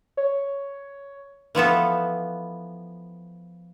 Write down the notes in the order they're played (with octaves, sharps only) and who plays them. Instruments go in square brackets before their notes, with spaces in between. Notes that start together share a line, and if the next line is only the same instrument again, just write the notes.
[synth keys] C#5
[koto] E3 F3 B3 A4